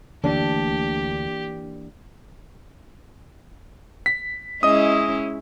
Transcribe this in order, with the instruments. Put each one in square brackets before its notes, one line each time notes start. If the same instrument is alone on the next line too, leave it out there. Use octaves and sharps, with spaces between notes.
[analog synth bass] D2 [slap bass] E3 A#3 [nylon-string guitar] D4 [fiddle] G4
[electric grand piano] B6
[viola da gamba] G#3 C#4 E4 [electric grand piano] D#5 D#6